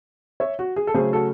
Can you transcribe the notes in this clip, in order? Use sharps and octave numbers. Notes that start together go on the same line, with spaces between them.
C#5 E5
F#4
G#4
A4
C#3 F#3 A3 G#4 C5
F#4 A4